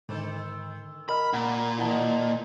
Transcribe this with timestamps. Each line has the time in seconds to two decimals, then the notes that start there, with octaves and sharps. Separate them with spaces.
0.09 G#2 D3 D#3 A4 C5
1.09 A#4 D#5 B5 F6
1.33 A#2 F#5
1.78 D#3 E3 G#3 E4 F#5 A5